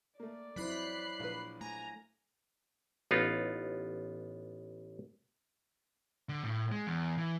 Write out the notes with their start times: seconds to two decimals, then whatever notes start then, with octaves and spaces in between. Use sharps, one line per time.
0.20 A3 A#3 D5
0.56 F2 F#3 E4 C5 B5 F#6 C7
1.19 A#1 B4
1.61 A3 G#5 A#5
3.11 A1 B3 D#4 F4
6.29 D3
6.44 A2
6.72 G#3
6.87 E2
7.18 E3